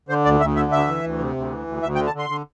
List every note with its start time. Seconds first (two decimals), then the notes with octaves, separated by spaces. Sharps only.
0.09 D3 C5
0.25 D2 D5
0.40 D2 E5
0.56 D3 E5
0.72 D2 E5
0.88 E3
1.04 D2
1.19 C3
1.36 D2
1.51 E3
1.67 D2
1.83 D2 E5
1.95 G5
1.98 D3
2.07 A5
2.14 D3 C6
2.30 D3